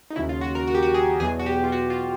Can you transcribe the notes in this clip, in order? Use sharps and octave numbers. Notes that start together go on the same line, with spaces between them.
D#4
D#2 C#3 F#3 E4
F4
F#4
A#4
F#4
G4
F#4
G#4
E2 B2 F#3 G#4
F#4
G4
F4
F#4
F4